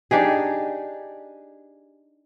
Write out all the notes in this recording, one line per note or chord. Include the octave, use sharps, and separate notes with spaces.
D4 D#4 G4 G#4